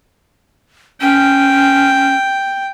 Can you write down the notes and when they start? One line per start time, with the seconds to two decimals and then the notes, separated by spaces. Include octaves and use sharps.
1.01 C#4 G5